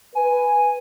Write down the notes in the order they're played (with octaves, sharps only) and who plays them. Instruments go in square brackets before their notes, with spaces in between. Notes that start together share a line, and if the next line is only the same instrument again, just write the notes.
[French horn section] B4 [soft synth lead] G#5